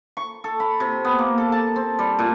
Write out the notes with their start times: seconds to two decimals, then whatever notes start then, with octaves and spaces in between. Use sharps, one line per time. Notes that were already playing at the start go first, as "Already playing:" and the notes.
0.17 C#6
0.44 A4
0.60 B5
0.80 C3
1.05 B3
1.18 A#3
1.38 A4
1.52 A5
1.76 C4
1.99 G3
2.19 A#2